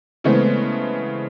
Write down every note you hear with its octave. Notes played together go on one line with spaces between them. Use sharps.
C#3 E3 G#3 A3 B3 C4